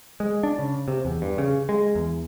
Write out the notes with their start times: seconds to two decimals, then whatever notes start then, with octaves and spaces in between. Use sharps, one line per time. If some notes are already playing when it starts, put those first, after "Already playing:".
0.20 G#3
0.43 D4
0.59 C#3
0.88 C3
1.05 E2
1.22 G2
1.38 C#3
1.69 G#3
1.95 E2